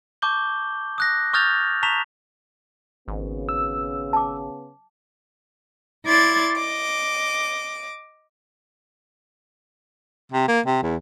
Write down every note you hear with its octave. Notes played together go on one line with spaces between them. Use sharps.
A5 C#6 D6 G6 G7
D#6 F#6 A#6
C#6 D#6 F6 G6 A6 F7
A5 A#5 C#6 B6 E7 F7
G#1 C#3 B3
E6
A5 D6
E4 D5 C6 D6 G#6 A6
D#5 D6
C3
A#3
C3
E2